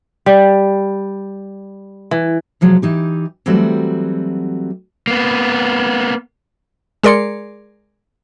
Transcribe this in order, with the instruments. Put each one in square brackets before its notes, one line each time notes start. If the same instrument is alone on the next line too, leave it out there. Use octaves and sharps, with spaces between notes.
[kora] G3
E3
[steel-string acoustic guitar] C3 F3 F#3 G#3
E3 D#4 G4
E3 F#3 G3 A3 C4 F#4
[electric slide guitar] A#3 B3
[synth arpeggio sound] G#3 G#4 A#4 D5 C6 C#7